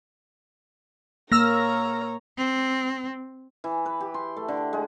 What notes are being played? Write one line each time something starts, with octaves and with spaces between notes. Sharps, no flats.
A#3 C#5 A#5 E6 F6 A#6
C4
E3
B4
G4
C6
A3
D3
G#3